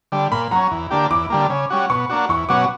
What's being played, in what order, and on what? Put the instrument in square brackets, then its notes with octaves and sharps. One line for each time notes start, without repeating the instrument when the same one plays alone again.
[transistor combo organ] D3 G3
[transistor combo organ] A#2 [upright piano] B5
[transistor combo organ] F#3 C#4 [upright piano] A#5
[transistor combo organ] E2
D3 A#3 D4 G4
[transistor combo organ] E2 [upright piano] D6
[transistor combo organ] D3 G3 A#3
C#3
G3 C#4 F#4
[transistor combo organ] B2 [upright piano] C#6
[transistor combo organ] A#3 D4 F#4
[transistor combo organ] E2 [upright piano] C#6
[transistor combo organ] B2 F#3 C#4 F#4 [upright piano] D6